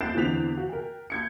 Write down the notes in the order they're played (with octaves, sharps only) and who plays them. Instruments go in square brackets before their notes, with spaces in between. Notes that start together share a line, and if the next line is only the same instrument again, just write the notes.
[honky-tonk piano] F#6 G6 A6 C7 D7 E7
E2 D3 C4 B6 F7
F#4
A#4 G5
G6 G#6 C#7